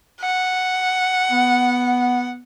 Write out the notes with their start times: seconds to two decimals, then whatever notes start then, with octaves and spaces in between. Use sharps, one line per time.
0.21 F#5
1.31 B3